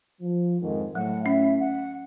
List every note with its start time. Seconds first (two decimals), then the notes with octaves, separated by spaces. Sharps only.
0.21 F3
0.62 F2 G#2 D#3
0.95 A2 F#3 F#5
1.26 C#4 E5
1.60 F#5